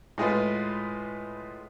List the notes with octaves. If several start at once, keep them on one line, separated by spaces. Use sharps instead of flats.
A2 G#3 F4 B4